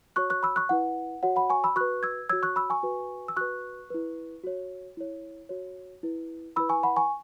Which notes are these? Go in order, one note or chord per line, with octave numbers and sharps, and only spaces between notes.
F#4 C#5 C#6 F#6
C#6 F#6
B5 E6
C#6 F#6
E4 B4 F#5
F#4 C#5 F#5
F#5 B5
G#5 C#6
B5 E6
F#4 B4 C#6 F#6
E6 G#6
F#4 C#5 E6 G#6
C#6 F#6
B5 E6
G#5 C#6
F#4 B4
E6
F#4 B4 C#6 F#6
E4 B4
F#4 C#5
E4 C#5
F#4 C#5
E4 B4
E4 B4 B5 E6
G#5 C#6
F#5 B5
G#5 C#6